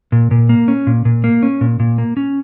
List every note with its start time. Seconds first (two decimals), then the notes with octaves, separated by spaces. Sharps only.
0.12 A#2
0.31 A#2
0.49 A#3
0.68 C#4
0.87 A#2
1.05 A#2
1.24 A#3
1.43 C#4
1.61 A#2
1.80 A#2
1.98 A#3
2.17 C#4